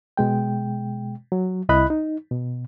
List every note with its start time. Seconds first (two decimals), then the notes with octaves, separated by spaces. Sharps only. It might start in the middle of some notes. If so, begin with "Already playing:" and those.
0.17 B2 G#3 G5
1.32 F#3
1.69 C2 E4 D#5 B5 F#6
1.90 D#4
2.31 B2